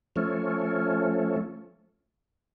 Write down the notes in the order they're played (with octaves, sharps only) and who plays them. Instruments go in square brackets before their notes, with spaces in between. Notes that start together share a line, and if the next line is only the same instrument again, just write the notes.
[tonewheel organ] F3 A3 C#4